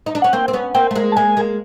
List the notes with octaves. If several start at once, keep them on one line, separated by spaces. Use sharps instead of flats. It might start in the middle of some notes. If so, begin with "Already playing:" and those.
D#4
D4
C#4 F#5
A#3 C4 G5
C4
B3 C#4
A#3 C4 G5
A3
G#3 A#3
A5
G#3 A#3 G#5
G#3 A#3